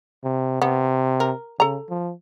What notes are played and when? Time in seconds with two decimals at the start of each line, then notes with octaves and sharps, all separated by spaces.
0.24 C3
0.62 C3 B3
1.20 A#4
1.60 C#3 A4 A#5
1.90 F3